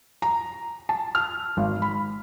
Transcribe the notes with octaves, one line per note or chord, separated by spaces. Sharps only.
A#5
A5
F6
G#1
B5